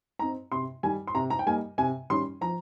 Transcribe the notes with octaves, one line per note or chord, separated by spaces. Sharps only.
C4 D#4 A#5
C3 C6
D#3 G3 G#5
C6
C3 A#5
A#5
G5
G3 A#3 D#4 G#5
C3 G#5
D#3 G3 C#4 C6
F3 A#5